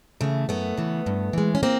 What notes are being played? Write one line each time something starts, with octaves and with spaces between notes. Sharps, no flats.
C#3 E3 A3
F#2 A3 B3
C#3 E3
G2
E3 G#3
C#4
A#3 C4